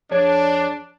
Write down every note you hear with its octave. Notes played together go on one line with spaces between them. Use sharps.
F2 D4 G#4 C#5